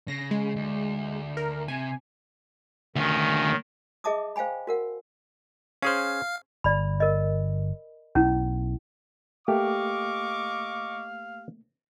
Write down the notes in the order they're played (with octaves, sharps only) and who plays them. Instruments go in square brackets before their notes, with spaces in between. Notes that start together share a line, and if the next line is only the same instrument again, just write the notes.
[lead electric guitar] C#3 [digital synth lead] A#6
[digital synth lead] G#3
[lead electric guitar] D2
[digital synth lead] A#4
[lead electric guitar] C3 [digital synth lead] G#5
[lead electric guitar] D2 C#4 [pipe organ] D#3
[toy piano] G#4 D#5 E5 A5 D6 D#6
C5 F5 G5 G#5 B5
F#4 A#4 F#5
[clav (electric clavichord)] C#4 G#4 C5 [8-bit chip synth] F5 F6
[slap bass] G1 [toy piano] D5 B5
[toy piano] A#4 D#5
[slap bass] B1 [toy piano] C#4 E4
[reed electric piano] A3 A#3 [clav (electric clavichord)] G4 [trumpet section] D#5 C#6 D6 [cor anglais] F5